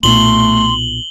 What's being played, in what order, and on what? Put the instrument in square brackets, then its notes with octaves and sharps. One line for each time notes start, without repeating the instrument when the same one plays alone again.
[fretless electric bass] B1 A#2 B3 [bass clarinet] A3 [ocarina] C6 [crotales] F#7 G7